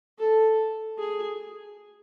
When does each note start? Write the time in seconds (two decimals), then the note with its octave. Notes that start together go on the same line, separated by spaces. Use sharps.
0.19 A4
0.98 G#4